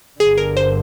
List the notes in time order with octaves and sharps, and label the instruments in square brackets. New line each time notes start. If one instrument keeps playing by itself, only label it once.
[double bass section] G1 G2 D3 [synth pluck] G#4
[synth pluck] A#4
C5